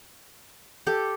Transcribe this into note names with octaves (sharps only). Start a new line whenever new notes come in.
G4 A4